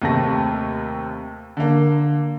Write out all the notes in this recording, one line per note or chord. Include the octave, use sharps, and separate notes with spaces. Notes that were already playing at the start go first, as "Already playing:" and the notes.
D#2 C3 A3 A#6
D3 A#3